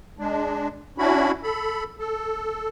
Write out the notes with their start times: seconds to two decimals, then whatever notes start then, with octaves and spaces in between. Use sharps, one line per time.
0.19 G#3 D4
0.98 C#4 D4 E4 F#4 B5
1.43 A4 B5
1.99 A4